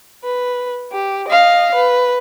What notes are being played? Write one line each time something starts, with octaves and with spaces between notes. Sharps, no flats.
B4
G4
D#5 F5
B4